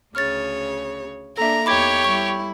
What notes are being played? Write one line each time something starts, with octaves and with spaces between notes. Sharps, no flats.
D2 C#3 C#5 F6 A6
A#3 D4 A4 E5 A#5
E2 D#4 G4 C#5 B5 D6 G#6
G3 E4 C#6